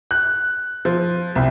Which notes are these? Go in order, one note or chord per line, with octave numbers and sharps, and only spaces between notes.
F#6
F3
C2